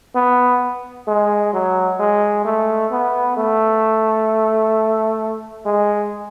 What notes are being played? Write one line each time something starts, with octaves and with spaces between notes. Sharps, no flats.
B3
G#3
F#3
G#3
A3
B3
A3
G#3